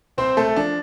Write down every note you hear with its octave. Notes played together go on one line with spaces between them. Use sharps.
C2 C4 C5
C2 A3 A4
F3 D4